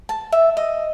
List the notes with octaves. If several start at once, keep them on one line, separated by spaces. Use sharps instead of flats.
A5
E5
D#5